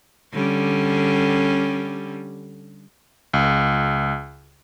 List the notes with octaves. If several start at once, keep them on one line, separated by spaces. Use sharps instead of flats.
D3 G3 C#4
C#2